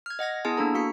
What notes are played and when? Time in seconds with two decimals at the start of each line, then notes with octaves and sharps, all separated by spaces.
0.06 F6 G#6
0.19 D#5 F#5 G#6 A#6
0.45 B3 E4 G#4 G#5 A5
0.57 A#3 D4 A4 A#5
0.74 A#3 F#4 B6 C#7